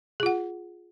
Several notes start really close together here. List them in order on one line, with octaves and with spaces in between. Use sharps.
G#4 F4 F#5